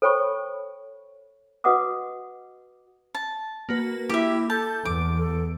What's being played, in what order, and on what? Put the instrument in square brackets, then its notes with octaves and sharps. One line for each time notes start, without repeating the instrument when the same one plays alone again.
[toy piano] A4 C5 C#5 G5 B5 C#6
F#4 B4 D#5 F#5 D6 D#6
[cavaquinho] A5
[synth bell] A#3 F#4 B4
[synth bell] A#3 D6 [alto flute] E4 [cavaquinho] G4 E5
[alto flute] A4 [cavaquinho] A5 [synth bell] G6
[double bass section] E2 [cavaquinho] D6 [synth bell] D7
[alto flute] A4